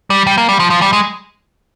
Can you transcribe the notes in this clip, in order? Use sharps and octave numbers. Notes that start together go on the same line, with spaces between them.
G3
G3
A#3
G3
F3
F3
G3
G#3